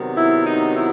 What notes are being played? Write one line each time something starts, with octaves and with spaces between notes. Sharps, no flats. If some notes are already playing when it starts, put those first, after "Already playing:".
Already playing: C3 D#3 F#3 B3
E4
D#4
E4